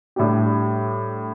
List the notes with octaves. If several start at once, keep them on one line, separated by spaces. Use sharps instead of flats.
A2 G3 D4 G4